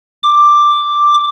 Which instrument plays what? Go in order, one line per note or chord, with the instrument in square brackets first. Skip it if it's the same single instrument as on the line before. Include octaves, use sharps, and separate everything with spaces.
[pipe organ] D6